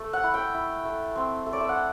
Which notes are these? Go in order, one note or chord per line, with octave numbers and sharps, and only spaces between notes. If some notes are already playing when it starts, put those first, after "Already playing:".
Already playing: A3
F#5
E4
G5
E4
A3
C4
A3
D5
E5
F#5